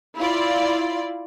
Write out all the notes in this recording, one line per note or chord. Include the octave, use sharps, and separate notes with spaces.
E4 F4 D5